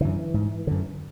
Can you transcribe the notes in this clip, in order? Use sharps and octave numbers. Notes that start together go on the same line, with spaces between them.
F#2 D3 E3
G#2
F#2 D3